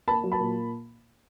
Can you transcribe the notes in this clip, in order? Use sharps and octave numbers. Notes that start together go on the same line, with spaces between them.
A#3 A5 B5
F#3
A5 B5
A#2